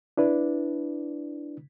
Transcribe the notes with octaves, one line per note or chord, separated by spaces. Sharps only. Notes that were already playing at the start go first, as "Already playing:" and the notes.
D4 E4 B4 D5